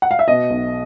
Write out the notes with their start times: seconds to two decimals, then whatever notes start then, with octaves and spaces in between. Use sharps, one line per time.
0.02 F#5
0.11 F5
0.19 E5
0.28 B2 D#5
0.50 B1